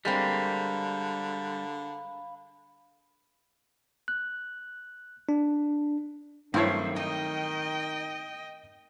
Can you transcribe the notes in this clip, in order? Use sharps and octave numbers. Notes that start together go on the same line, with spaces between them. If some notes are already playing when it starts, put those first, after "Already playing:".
D3 G3 G#3 A#3 C4 F5 B5
F#6
D4
G2 D#3 F#3 A3 C4 E4 C5 C#5
D#4 D#5 G5